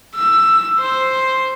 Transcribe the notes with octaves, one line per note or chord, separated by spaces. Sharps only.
E6
C5